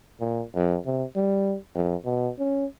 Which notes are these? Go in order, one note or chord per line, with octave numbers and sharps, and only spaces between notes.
A#2
F2
C3
G3
F2
B2
C#4